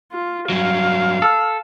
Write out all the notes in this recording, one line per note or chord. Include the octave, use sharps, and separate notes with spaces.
F4
G2 F#3 F5
A4